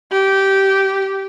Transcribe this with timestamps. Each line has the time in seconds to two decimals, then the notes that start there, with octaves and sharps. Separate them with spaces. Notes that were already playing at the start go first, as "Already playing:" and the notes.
0.12 G4